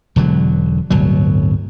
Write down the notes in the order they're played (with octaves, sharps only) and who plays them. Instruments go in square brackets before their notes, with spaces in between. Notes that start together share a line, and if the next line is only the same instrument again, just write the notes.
[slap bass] E1 D3 F#3
D1 G1 B2 F#3